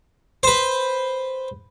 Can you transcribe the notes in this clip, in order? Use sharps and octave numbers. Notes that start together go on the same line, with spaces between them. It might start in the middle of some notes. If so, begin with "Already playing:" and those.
B4 C5